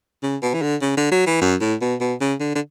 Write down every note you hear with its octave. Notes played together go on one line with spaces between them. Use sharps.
C#3
B2
E3
D3
C#3
D3
F#3
E3
F#2
A2
B2
B2
C#3
D3
D3